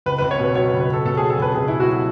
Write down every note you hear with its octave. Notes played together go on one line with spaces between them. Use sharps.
C#2 B4
B4
C#2
C#5
B2 B4
F#3 C#5
B4
C#2
B4
C#2 A4
B2 A4
G#4
F#3
A4
C#2 B4
C#2 G#4
B2 E4
F#4
F#3